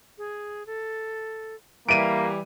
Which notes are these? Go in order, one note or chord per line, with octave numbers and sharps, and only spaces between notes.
G#4
A4
E3 G3 A#3 E5 D7 D#7